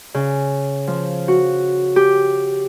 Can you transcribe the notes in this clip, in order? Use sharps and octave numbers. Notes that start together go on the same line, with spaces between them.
C#3
F3
F#4
G4